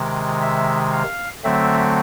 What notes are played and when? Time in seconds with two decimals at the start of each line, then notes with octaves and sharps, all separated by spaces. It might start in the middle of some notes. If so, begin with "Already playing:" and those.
Already playing: C3 D#3 G#3
0.42 E5
0.93 F5
1.44 D3 F#3 A3 C4 E5